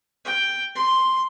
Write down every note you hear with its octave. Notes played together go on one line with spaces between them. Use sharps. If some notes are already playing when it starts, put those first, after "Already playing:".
G5
C6